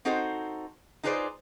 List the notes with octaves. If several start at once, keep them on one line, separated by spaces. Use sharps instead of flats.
C4 D#4 F#4 A4 C5
D#4 F4 G#4 B4 C5 D5